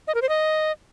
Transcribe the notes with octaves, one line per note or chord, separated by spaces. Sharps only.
D#5
A#4
C5
D#5